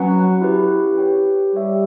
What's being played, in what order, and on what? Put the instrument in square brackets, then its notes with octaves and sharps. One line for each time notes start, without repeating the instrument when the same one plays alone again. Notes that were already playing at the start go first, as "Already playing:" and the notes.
Already playing: [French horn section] F#3 [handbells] C#4 F#4 B4 F#5
[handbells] E4 G4 B4
G4 C#5 G5
[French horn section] G3 [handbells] G4 C#5 E5